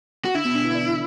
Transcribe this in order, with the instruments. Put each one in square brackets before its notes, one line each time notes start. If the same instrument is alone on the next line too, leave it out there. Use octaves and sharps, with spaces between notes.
[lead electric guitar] F#4
[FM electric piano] D3 [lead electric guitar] E4
[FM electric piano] B2
D3
E3
B3
D4